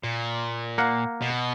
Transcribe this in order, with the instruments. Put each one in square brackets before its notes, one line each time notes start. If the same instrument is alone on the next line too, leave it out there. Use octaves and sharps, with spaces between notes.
[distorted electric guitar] A#2
[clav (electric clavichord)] A#3 F#5
[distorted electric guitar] B2